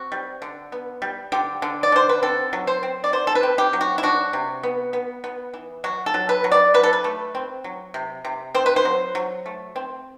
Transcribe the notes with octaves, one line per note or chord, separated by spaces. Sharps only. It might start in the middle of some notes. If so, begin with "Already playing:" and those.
Already playing: C4 F#4
G3
D3
B3
G3
D3 G4
D3
D5
D3 C5
B4
C4 A4
F#3
C5
C4
D5
F#3 C5
A4
B4
C4
G4
F#3
F#4
E4
D4 F#4
C3
B3
B3
B3
E3
F#3 F#4
A4
F#3
B4
F#3
D5
F#3 B4
A4
B4
A3
C4
F#3
C3
C3
C4 C5
B4
C5
F#3
F#3
A3
C4